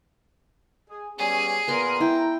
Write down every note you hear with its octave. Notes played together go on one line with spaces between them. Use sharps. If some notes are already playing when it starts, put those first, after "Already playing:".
G#4
G3 B3 C#4 G#4
A#2 B3 A#4 C6
E4 G5 A#5